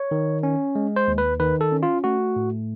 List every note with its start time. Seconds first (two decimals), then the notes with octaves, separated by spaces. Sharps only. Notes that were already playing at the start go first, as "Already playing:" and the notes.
Already playing: C#5
0.11 D#3
0.43 C#4
0.75 G#3
0.96 C5
1.08 D#2
1.18 B4
1.40 D#3 B4
1.61 A4
1.72 C#4
1.83 F4
2.04 A3 F#4
2.36 A2